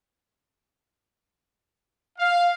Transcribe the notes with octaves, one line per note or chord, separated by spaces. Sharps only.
F5